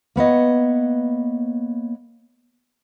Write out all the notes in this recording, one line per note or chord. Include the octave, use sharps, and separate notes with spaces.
A#3 B3 C#5 D#5